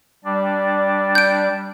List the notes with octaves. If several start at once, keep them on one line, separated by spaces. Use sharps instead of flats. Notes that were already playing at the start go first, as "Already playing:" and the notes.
G3 D4 D5
G6 D7